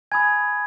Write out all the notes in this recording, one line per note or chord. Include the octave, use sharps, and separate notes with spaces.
G#5 B5 D#6 G#6